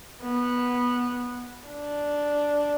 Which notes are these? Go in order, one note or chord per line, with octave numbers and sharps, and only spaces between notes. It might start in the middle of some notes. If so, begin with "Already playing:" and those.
B3
D4